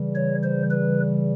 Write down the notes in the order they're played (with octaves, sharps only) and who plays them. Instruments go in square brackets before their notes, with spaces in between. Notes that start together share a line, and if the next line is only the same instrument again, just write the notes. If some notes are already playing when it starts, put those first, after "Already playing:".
Already playing: [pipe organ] C#3 E3 G3
C#5
C5
B4